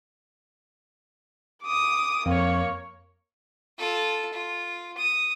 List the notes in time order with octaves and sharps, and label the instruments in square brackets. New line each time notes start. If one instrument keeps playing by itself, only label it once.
[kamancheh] D6 D#6
[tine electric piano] F2 [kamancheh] A#3 C#5
[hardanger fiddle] F4 A4
F4
D#6